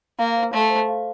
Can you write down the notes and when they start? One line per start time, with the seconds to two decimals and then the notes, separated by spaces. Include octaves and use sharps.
0.19 A#3 F5
0.36 C5
0.53 A3 C6
0.70 C5
0.88 F5